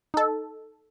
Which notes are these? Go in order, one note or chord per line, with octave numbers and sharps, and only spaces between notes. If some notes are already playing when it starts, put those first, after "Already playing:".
D#4 A4